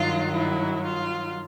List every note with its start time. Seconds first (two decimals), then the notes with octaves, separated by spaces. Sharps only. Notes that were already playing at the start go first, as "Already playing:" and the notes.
Already playing: G2 D#3 F#3 F4
0.32 E4
0.83 F4